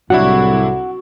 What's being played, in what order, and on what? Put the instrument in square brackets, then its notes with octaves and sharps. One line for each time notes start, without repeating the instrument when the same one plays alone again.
[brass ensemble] C2 A2 [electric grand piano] F#3 D4 E4 [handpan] F#4 [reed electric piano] F#5